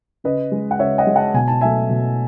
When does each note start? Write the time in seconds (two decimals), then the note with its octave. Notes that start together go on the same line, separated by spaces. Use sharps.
0.24 C#3 B4 D#5
0.52 G#3
0.71 F#5
0.79 C#3 C#5 E5
0.98 D#5 F#5
1.07 G#3
1.16 F#5 A5
1.34 B2 G#5
1.48 A5
1.61 F#3 A3 E5 G#5
1.89 B2